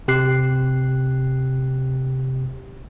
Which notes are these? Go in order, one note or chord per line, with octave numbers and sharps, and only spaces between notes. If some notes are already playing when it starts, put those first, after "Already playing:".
C3 G4 F#6 C7